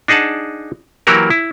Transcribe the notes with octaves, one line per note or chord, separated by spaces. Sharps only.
D4 D#4 G#4 F#5 A5
E3 F#3 A#3 F#4 G4 A#4
E4